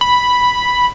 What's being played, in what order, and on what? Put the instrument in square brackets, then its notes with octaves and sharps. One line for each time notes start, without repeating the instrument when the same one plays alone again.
[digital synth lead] B5